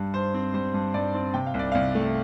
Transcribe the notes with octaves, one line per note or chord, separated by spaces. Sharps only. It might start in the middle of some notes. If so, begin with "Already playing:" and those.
Already playing: G2 G3
G2 C5
C4
G3 C5
G2
G2 D5
C4
C3 G5
F5
C2
D5
C2 F5
A3